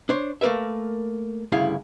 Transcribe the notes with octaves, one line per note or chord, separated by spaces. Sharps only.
D4 C5 C#5
A3 A#3 A#4 B4 E5
D2 G2 C#3 E4 F5